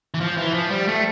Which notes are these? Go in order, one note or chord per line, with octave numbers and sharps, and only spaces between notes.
E3
F3
E3
F3
G3
A3